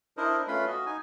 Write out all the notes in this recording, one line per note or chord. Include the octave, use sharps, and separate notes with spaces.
D4 E4 A#4 C5 D#5
A3 C#4 F4 B4 B5 C6
F#4 D#5
D#4 G#5